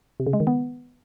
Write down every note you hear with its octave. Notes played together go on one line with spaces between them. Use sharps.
C3
C#3
G#3
D#3
B3